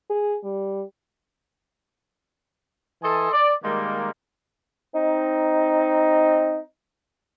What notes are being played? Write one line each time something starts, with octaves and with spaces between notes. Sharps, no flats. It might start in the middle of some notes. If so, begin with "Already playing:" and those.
G#4
G3
E3 A4 D#5 G#5 A5 C6
D5
D#3 G3 G#3 A#3
C4 D#4